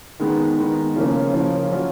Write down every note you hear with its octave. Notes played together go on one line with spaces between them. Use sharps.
D#3 G#3 B3 D#4
D#3 G#3 B3 D#4
C#3 F3 A#3 C#4
C#3 F3 A#3 C#4
F#3 C#4 F4